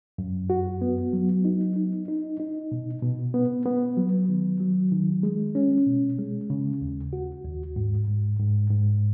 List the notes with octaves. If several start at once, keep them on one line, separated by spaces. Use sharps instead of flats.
F#2
F#4
B3
F#3
D#4
D#4
D#4
D#4
B2
B2
B3
B3
F#3
D#3
F#3
D#3
G#3
C#4
B2
G#3
C#3
D#2
F#4
D#2
G#2
G#2
G#2
G#2